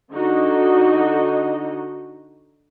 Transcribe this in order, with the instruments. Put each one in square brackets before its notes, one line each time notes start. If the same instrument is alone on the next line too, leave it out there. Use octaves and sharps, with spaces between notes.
[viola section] D3 D#4 F#4 D#5